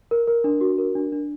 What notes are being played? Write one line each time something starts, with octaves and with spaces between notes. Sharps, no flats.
A#4
A#4
D4
F#4
A#4
D4
D4